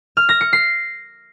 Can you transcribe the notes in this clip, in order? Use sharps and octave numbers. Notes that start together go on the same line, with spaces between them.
F6
A#6
C#7
C7